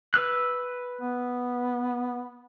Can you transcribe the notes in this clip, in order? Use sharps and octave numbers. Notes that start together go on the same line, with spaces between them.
B4 E6 F#6
B3